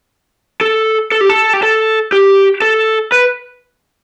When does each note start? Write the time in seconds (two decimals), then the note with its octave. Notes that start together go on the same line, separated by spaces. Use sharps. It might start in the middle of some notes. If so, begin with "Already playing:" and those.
0.61 A4
1.12 A4
1.21 G4
1.29 A4
1.53 G4
1.63 A4
2.12 G4
2.62 A4
3.12 B4